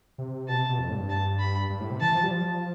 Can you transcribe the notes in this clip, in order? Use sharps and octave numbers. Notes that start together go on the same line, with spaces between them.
C3
B2 A5
C3
B2
F2
A2
G2
A5
B5
G2
A2
C3
E3 A5
F3
G3
F3